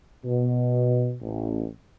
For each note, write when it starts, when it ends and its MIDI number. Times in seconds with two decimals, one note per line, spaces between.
0.24 1.15 47
1.22 1.67 33